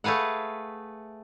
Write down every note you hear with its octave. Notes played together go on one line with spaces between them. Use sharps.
A3 G#4 B4 F5 F#5